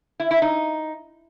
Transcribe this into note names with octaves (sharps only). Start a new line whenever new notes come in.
E4
E4
D#4